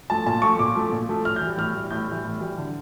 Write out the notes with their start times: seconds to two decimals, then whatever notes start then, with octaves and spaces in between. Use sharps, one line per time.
0.10 F3 A3 A5
0.26 A#2 A5
0.42 F3 A3 C#6
0.59 A#2 D6
0.75 F3 A3
0.92 A#2
1.09 F3 A3
1.25 A2 F6
1.36 E3 G6
1.46 G3
1.58 A2 F6
1.75 E3 G3
1.91 A2 G6
2.07 E3 G3
2.25 A2
2.40 E3 G3
2.57 D3